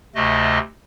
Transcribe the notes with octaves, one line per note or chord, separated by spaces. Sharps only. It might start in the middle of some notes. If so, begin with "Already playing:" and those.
D2 C3 A3 D#5